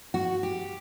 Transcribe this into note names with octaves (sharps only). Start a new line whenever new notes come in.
F#4
G4